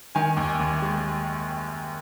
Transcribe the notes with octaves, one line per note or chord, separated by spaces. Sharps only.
D#3 G#5
D#2
D#2
G#3